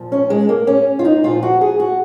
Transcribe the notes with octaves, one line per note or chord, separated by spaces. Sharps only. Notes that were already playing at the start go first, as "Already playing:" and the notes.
Already playing: A#2 F3
C#4
G#3
A#3
C#4
F4
D#4
A#2 F3 F4
F#4
G#4
F#4